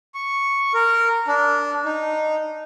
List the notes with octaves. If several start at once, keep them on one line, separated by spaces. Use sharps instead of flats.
C#6
A#4
D4
D#4